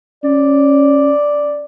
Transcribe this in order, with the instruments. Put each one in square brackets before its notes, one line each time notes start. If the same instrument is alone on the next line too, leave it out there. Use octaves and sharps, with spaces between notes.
[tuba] C#4 [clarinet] D5